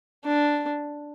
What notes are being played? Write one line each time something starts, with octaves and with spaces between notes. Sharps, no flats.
D4